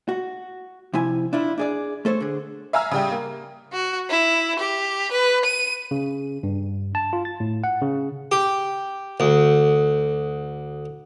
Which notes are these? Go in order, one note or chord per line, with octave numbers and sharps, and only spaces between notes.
F#4
C3 F3 E4 G#5
D4 E4 F4
D4 G#4 D5
A3 A4 C5 C#5
D3 G#4
E5 F5 G#5 A#5 E6 F6
C#3 G3 G4
A#3
F#4
E4
G4
B4
D#7
C#3
G2
A5
F4
A6
A2
F#5
C#3
G4
D2